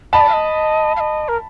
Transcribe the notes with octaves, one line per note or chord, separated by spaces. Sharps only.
D#5 A5 B5
D5
F5
D#5
F5
D#5
A#4